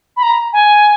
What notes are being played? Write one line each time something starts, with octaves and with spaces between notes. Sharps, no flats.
B5
A#5
G#5